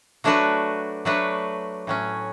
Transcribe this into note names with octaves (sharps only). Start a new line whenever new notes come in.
F#3 A3 D4 F#4 B4
F#3 A3 D4 F#4 B4
A2 F#3 C#4